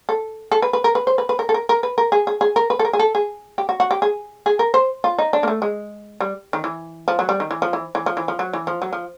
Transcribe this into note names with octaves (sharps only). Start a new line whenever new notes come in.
A4
A4
B4
B4
A#4
B4
C5
B4
B4
A#4
A4
A#4
A#4
B4
A#4
G#4
G#4
G#4
A#4
B4
A4
A#4
G#4
A4
G#4
G4
F#4
F#4
G4
G#4
G#4
A#4
C5
F4
D#4
D4
A#3
A3
G#3
G3
D#3
E3
F3
F#3
G3
D#3
E3
F3
E3
E3
F3
E3
F3
F#3
E3
F3
F#3
F3